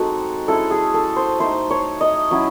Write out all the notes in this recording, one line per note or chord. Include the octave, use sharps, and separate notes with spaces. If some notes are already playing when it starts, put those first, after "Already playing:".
Already playing: G#3 C4 D#4 F#4 A4
G#3 C#4 E4 A4
G#4
A4
C5
A3 D#4 C5
C#5
D#5
F#3 C#4 E4